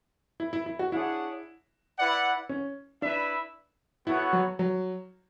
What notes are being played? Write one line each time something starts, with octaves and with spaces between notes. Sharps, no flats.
E4
E4
E4
F#4
D4 E4 G#4 C#5 F#5
E4 B4 D5 F#5
C#4
D4 E4 B4 E5
B3 E4 F#4 A4 C#5 F#5
F#3
F#3